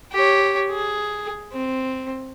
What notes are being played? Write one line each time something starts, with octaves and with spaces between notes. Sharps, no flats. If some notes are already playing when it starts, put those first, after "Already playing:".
G4 C#5
G#4
C4